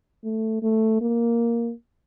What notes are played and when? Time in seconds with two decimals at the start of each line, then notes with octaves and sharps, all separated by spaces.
0.24 A3
0.63 A3
1.01 A#3